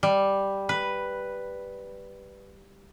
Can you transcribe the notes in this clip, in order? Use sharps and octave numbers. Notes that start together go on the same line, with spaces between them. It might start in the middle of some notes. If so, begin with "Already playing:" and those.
G3
B4